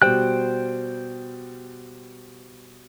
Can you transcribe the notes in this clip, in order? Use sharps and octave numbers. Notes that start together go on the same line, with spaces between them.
B2 G3 C5 G5 F#6